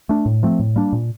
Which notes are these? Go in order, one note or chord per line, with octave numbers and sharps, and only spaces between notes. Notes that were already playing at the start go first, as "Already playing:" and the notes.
A3 D4
A2
F3 A3 C4
A2
G3 A#3 D4
A#2